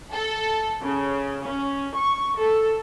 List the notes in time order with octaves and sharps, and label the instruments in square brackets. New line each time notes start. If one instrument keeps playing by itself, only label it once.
[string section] A4
C#3
C#4
C#6
A4